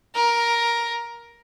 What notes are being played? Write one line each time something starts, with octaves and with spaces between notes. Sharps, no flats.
A#4